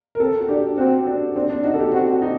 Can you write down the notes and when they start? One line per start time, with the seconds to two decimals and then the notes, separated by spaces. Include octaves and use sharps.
0.15 A#4
0.20 C4 A4
0.40 F#4
0.49 D4 G4
0.78 C4 F#4
1.06 D4
1.36 C4 D4
1.50 D4
1.64 D#4 F#4
1.74 A4
1.79 G4
1.93 C4 F#4
2.22 D#4